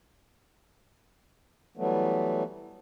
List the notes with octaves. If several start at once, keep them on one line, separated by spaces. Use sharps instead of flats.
E3 F#3 G3 A3 B3